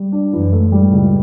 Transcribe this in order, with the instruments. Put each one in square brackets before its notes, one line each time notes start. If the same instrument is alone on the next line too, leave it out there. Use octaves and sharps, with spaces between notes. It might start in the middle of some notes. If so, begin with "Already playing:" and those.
Already playing: [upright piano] G3
D4
[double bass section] F#2 [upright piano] E3
[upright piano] A3
[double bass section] A2 [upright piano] G3
[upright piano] C#2